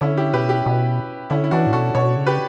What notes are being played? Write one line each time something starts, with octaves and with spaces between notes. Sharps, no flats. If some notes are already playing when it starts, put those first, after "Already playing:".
D3 C#4 E4
E4 G4
B2 G4 B4
E4 G4
B2
D3 C#4 E4
E4
E3 D4 F#4
A2
B2 F#4 A4
B2 A4 C#5
C#3
G4 B4